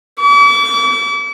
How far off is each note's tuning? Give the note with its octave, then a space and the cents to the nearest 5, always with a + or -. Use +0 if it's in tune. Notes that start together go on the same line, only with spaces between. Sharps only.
D6 -40